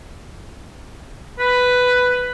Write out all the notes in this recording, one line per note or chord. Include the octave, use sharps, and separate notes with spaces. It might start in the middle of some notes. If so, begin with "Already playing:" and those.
B4